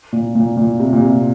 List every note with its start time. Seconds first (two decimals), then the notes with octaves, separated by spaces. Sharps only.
0.13 A#2
0.35 A#2
0.57 A#2
0.79 C3
0.93 A#2
1.02 C3